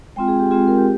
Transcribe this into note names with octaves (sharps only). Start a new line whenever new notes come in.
G#3 C4 F4 G5
G#4
G4
G#3 C4 F4 G#4
A#4
G4